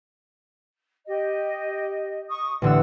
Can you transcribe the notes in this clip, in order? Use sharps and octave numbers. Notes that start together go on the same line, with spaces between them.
G4 D#5
C#6 D#6
A1 D3 D4 F#5 E6